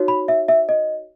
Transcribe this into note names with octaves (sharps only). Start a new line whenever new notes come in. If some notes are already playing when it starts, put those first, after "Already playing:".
Already playing: D#4 F#4 C#5
B5
E5
E5
D#5